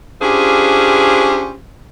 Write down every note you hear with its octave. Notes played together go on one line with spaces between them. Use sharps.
C#4 D4 F4 G4 G#4 C5